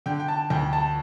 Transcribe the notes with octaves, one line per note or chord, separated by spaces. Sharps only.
D3 G5
G5
A5
D2 G5
A5